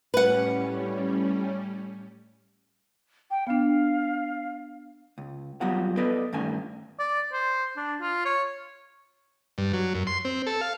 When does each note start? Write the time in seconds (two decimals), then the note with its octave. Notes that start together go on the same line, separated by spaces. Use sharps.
0.14 A2 G3 C#4 B4 F#5
3.30 G5
3.47 B3 D4 F5
5.18 C#2
5.61 F2 F#3 G3 B3 F4 F#5
5.97 B3 A4 B4 D5 D#5
6.33 G2 D#3 A3 C#4 G#5
6.99 D5
7.33 C5
7.77 D4
8.01 F4
8.25 C#5
9.58 G2
9.73 F#3
9.95 F#2
10.07 C6
10.25 C4
10.47 A4
10.61 F5